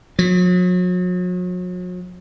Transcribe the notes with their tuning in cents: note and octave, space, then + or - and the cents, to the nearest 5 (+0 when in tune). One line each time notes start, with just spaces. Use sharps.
F#3 -40